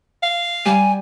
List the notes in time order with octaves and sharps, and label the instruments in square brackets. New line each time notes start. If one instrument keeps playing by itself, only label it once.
[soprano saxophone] F5
[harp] G3 [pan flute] G#5